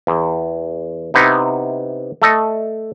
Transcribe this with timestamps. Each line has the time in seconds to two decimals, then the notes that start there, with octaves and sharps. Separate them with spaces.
0.07 E2
1.14 C3 B3 D#4 E4
2.22 A3 A4 D#5